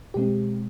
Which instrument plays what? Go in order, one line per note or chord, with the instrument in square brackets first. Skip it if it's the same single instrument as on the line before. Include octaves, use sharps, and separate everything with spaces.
[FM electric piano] B2 G#3 C4 G4